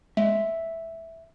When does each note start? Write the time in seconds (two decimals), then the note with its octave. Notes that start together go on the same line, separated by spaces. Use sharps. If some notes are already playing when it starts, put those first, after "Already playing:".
0.17 G#3 E5